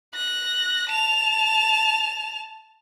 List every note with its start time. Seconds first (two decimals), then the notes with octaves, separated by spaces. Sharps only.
0.15 F#6 A#6
0.90 A5 F7